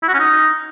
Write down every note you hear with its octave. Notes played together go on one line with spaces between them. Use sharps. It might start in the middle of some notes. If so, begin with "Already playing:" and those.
E4
F#4
C#4
D#4